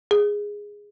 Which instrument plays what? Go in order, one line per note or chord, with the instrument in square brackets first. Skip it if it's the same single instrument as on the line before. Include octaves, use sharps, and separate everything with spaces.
[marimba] G#4